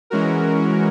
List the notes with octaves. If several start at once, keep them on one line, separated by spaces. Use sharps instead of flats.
E3 G#3 C#4 F#4 A#4